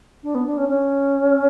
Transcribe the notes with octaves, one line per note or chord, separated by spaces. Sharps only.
D4
B3
D4
C#4
C#4